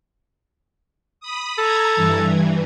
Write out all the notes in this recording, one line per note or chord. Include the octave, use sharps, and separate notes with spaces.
B5 D#6
A4 A#5 G#6
G2 E3